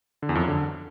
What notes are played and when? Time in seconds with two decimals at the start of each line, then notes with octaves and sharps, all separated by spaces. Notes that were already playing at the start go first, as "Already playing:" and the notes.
0.23 D3
0.29 E2
0.35 F2
0.42 F#2
0.48 D3